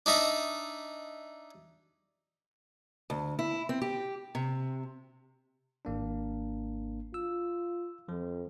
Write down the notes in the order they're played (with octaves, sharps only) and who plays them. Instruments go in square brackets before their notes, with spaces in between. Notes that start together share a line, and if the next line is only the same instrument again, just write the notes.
[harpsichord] D4 D#4 E5 A#5
[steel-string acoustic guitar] D2
E4
C4
G4
C3
[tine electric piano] G#1 A#3 D4
[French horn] F4 [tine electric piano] E6
[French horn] F2 [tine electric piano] F3